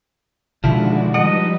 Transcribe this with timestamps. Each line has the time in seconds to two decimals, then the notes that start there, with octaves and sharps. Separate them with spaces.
0.64 B2 D3 D#3 F3 G#3 D4 E4 F#4
1.14 F3 G3 D#4 B4 D#5 F#5